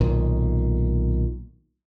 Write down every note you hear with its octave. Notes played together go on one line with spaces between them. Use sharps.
B1 A#2 D#3